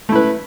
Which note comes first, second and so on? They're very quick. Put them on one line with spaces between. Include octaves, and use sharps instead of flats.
A3 E4 B4